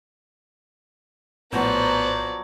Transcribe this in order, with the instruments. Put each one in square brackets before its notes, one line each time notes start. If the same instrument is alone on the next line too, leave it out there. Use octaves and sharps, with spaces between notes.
[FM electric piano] A#1 A2 [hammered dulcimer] F3 F#3 [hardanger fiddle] B3 D5 [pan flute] C5